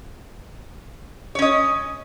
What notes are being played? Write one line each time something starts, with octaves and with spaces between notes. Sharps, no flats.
C#4 C#5 D#5